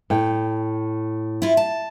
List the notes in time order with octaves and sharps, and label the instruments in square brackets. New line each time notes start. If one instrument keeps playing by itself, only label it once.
[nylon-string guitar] A2 G5
[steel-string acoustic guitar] E4 F4
A5